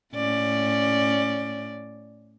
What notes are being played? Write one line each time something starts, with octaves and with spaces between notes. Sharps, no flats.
A2 C#4 D5